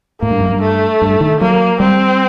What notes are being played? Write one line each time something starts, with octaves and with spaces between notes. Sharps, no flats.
A2 A#3
G2
F#2
G2
A3
G2
D#3
F#3 A#3
G3 C4